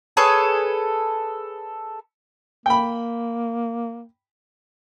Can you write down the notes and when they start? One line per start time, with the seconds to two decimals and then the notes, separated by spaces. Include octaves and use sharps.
0.17 G#4 A4 B4 C#5
2.66 A#3 G5 B5